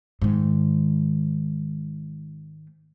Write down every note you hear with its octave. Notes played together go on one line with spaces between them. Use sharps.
G#2 D#3